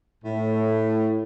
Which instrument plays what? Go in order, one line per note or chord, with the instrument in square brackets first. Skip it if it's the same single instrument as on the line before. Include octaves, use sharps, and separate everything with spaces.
[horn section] A2